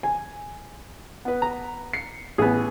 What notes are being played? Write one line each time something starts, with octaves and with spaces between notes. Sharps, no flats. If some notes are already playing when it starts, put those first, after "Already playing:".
G#5
B3 B4
A#5
C7 C#7
A1 B3 G#4